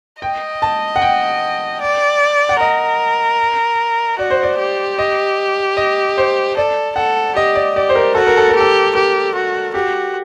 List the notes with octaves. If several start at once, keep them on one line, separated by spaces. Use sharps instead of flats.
D#5 G5
A5
F#5
G5
D5
F#5
A#4 D#5
F#4 D5
C5
D5
G4
D#5
D#5
C5
A4 D5
A4 F#5
G4 D#5
D5
G4 D5
C5
A#4
F#4 A4
A#4
A4
A#4
G4 A4
G4 A#4
F#4
F#4 G4